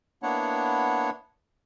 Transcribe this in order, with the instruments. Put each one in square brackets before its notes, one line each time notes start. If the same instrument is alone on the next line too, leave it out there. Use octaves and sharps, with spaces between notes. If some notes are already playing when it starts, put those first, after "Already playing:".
[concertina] A#3 B3 D4 E4 C#5 F#5